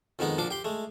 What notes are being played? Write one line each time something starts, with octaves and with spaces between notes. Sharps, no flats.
F2 D#3 G#3 B3 D#4
A#2 F3 D4 D6
G4 C6
G#3 A3